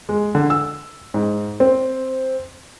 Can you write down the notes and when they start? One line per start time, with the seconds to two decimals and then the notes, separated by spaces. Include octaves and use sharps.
0.09 G#3
0.35 D3
0.50 E6
1.14 G#2
1.60 C4